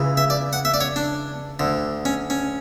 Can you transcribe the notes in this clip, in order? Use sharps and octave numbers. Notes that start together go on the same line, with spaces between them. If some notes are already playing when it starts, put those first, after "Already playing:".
Already playing: C#2 C#3 E3
E5
D5
F#5
E5
D5
C#5
D4
D2 D3
C#4
C#4